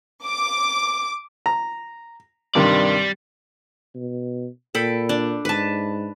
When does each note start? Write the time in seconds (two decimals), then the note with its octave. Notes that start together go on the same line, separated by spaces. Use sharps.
0.23 D6
1.46 A#5
2.55 G2 C3 D#3 G3 D5
3.95 B2
4.75 A#2 A4 G5 B5
5.09 D4
5.45 G#2 B4 A5